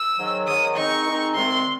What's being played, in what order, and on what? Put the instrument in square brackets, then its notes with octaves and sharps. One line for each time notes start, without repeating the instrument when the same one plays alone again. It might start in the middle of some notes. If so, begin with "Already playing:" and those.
Already playing: [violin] E6
[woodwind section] G#2 D#3 F#3
[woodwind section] G#2 D#3 F#3 [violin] D#6
[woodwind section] D#3 G#3 C4 D#4 [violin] C#6
[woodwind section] D#3 G#3 C4 D#4
[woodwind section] C2 C3 D#3 G#3 C4 [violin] C6